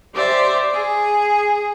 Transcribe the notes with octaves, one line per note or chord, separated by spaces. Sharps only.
G4 C5 D5 E5
G#4